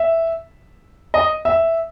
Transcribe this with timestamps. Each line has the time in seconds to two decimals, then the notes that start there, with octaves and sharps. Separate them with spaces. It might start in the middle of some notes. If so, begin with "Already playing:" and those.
Already playing: E5
1.14 D#5
1.45 E5